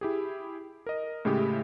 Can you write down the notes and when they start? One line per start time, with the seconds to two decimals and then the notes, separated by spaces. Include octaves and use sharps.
0.01 E4 G4 G#4
0.86 A#4 D#5
1.25 A2 C#3 G#3 E4 G4